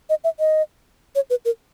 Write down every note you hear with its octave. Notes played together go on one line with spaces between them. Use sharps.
D#5
E5
D#5
C#5
B4
A#4